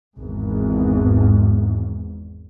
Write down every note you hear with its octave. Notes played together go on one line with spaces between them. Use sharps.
G#1 E2 G#2